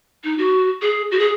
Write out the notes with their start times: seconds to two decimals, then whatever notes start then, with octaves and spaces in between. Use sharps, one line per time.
0.24 D#4
0.38 F#4
0.82 G#4
1.11 F#4
1.19 G#4